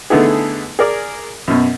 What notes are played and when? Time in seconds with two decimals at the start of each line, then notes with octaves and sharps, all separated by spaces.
0.10 D3 A3 B3 D#4 E4 G#4
0.79 G#4 A#4 D5
1.48 F#2 B2